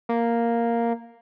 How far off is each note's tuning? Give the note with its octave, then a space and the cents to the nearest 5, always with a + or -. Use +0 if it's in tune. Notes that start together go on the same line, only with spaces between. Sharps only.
A#3 +0